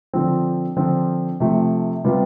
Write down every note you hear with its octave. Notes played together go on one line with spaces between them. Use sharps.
D3 F3 C4
D3 F3 C4 F4
C3 F3 A3
C3 G3 B3 F4